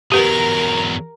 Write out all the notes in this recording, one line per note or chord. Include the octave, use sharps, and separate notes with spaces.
E2 F#3 G4 A#4 B4